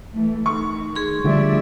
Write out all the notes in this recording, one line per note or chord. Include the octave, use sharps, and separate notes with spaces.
E3 A3
D#3 C#6
G#4 C6
D3 F3 G3 A3 D5 E5